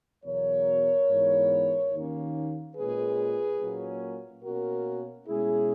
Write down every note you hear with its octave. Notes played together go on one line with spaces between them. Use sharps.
E2 B2 F#3 A#4 C#5
G#2 E3 B3
D#2 D#3 A#3 C#4
A#2 G#3 C#4 G#4 B4
A#2 F#3 A#3 C#4
B2 A#3 C#4 F#4 A#4
B2 G#3 C#4 E4 G#4